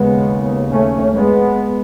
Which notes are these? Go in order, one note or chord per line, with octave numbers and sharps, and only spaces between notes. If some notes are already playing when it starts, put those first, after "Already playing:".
Already playing: D#2 C#3 G#3 B3
A3 C#4
G#3 B3